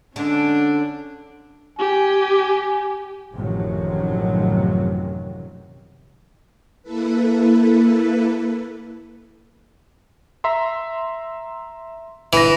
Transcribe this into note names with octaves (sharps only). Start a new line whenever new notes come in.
D3 G#3 C#4 D4
G4 G#5
A1 F#2 C3 D#3 F3 F#3
A#3 E4 A4 B4
E5 A#5 C6
G1 E3 A#6